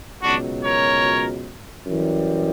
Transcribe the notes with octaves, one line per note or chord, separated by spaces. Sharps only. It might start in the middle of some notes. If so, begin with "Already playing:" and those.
C#2 B2 F#3 D4 F#4
A#4 C#5
F#2 E3 G3